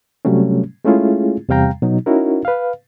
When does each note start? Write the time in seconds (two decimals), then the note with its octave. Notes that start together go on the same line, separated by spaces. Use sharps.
0.25 C3 F#3 G3 A3 C#4
0.85 G#3 A3 C#4 E4 F4 G#4
1.49 E2 C3 G3 F5 G5 A#5
1.82 B2 F#3 D#4
2.06 C#4 D#4 E4 F#4 A#4
2.45 B4 F5